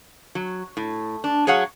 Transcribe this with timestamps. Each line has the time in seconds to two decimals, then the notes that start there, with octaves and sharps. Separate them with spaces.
0.35 F#3
0.77 A2
1.24 D4
1.47 F#3 G#4 C#5 F5 F#5